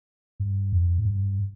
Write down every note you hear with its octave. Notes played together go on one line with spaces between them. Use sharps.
G2
F2
G#2
G2